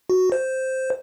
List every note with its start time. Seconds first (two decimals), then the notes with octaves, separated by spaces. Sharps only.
0.10 F#4
0.32 C5